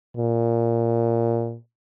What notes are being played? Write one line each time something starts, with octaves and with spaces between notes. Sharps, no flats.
A#2